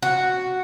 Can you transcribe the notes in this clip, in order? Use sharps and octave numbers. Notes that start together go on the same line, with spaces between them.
F#4